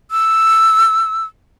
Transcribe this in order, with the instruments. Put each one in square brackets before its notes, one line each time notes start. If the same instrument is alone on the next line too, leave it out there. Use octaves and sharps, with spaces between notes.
[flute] E6